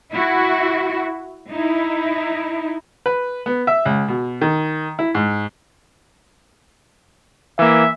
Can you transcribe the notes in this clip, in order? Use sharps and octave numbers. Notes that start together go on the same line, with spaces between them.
E4 F#4
D#4 E4
B4
B3
E5
C#2
B2
D#3
E4
G#2
E3 A#3 E5